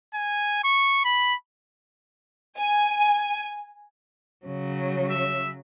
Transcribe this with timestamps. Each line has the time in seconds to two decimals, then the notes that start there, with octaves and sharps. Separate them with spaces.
0.14 G#5
0.64 C#6
1.05 B5
2.58 G#5
4.45 C#3 F#3
5.11 E5